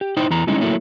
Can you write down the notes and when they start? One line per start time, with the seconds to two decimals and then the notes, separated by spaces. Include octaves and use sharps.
0.01 G4
0.17 D#4 E4 C5 G5
0.30 E2 E3 A#5
0.47 G3 G#3 C#4 D#4 E4
0.61 F#3 A3 A#3 E4